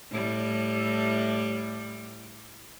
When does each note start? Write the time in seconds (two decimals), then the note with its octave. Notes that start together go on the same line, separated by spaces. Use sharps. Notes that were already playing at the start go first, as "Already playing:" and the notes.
0.11 A2 G3